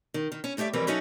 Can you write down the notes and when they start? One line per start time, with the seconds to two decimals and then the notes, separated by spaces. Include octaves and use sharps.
0.14 D#3
0.32 D#3
0.44 C#4
0.57 G2 A3 G4 D5 E5
0.73 F2 E3 G3 C4 A#4 B4
0.87 F#3 C#4 D#4 F#4 A4 E5